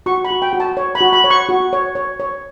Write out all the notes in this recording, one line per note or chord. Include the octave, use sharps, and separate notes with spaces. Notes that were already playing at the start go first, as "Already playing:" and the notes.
F#4 C#6
B5
F#4
G5
F#4
A5
C#5
B5
F#4
B5
C#5
C#6
F#4
C#5
C#5
C#5